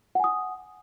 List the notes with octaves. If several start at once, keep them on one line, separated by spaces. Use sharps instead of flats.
F#5 G#5 D#6